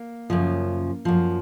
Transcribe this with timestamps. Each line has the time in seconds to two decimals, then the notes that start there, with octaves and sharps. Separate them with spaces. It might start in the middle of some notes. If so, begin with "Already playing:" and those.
Already playing: A#3
0.30 F#2 C#3 F3
1.05 F#2 F3